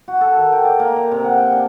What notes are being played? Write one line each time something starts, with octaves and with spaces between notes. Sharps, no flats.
F#4
A4
D#3
G5
D5
A#3
A#5
C3
F#5
G5
D4